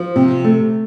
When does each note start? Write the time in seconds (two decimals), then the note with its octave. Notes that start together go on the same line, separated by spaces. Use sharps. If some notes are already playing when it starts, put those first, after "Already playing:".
Already playing: F3
0.16 C3
0.44 A3